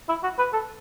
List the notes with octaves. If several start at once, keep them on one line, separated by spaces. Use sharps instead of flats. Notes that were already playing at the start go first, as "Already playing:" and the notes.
E4
F#4
B4
A4